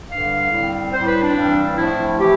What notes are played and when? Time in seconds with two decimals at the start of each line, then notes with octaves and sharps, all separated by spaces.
0.11 G2 D3 G3 F5
0.52 A2 G3 C4
0.93 A2 G3 C4 C5
1.07 B4
1.21 D4
1.35 G2 E3 G3 C4
1.76 A2 F3 A3 E4
2.18 E3 A3 C4 G4